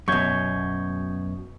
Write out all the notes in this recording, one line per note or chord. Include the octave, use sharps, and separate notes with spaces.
F#2 B2 C#6 G6 G#6